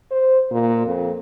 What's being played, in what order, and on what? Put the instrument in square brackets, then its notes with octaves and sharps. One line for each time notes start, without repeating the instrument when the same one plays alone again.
[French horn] C5
A#2
F2